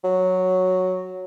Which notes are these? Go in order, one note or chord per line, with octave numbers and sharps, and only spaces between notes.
F#3